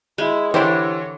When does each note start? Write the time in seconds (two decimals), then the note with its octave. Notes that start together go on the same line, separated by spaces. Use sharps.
0.18 G#3 E4
0.54 D3 E3 D4 E4 G4 C5 C#5